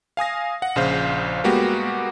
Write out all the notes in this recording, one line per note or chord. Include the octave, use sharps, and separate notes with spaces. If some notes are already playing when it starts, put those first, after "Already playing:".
F5 G#5 D#6 A#6
F#5
A#1 C#3 C5 F5
G3 G#3 A#3 B3 F#4 G4